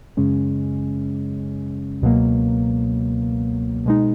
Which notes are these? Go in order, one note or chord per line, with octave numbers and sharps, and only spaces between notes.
F#2 C#3 G#3 C#4
C#2 B2 F#3 A#3
B2 G#3 D#4